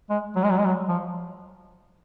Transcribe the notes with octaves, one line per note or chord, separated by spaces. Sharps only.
G#3
F#3
G#3
F#3
G#3
F#3
F3